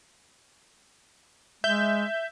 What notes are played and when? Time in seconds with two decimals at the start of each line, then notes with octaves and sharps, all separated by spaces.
1.64 G#3 E5 G6